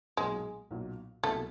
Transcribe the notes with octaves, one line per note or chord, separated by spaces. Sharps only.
B1 A#2 F#3 G#3 A#3
B1 A#2 F#3 A#3
C2 B2 F#3 A3 A#3